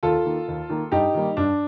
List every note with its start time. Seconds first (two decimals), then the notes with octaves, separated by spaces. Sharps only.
0.03 D#2 F4 A4
0.26 D#3 A#3
0.48 D#2
0.70 D#3 A#3
0.92 G2 D#4 G4
1.14 D#3 G3 A#3
1.37 G2 D4